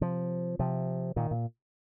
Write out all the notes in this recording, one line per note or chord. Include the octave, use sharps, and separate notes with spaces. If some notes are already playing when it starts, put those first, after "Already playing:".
C3 F3
C3 F3
A#2 D#3
A#2